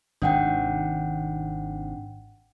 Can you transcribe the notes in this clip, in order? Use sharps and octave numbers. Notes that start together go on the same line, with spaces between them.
G#1 C3 D#3 D4 F#5 G5